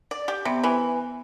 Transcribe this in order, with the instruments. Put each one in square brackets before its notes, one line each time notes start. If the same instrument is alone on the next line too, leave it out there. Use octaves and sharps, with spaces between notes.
[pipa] D5
G4
[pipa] C3 [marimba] B3
[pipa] E3